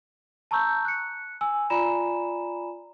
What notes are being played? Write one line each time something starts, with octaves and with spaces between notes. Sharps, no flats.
A5 A#5 C#6 E6 G6
F#6 C#7
G#5 E6
F4 D5 G#5 A#5 B5 E7